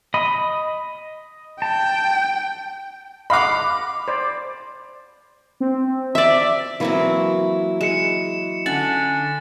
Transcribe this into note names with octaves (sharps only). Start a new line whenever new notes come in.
D#5 B5 D#6
G5 A5
D#5 F5 F#5 B5 D6
C5 D5
C4
D5 E5
E3 F#3 A#3 C4 E4
G#3 C#7 E7
D3 C#4 D4 F#5 A6